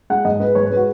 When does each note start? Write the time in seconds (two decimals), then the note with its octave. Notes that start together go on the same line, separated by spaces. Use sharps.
0.10 G#3 F#5
0.25 G#2 D#5
0.40 G#3 B4
0.55 G#2 C#5
0.66 G#3 B4
0.76 F#4